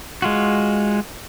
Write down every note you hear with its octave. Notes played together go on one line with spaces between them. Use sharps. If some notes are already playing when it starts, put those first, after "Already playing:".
G#3 F4 F#4